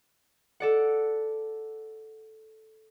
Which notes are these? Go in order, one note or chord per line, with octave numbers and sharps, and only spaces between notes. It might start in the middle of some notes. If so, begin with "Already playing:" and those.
A4 D5 F#5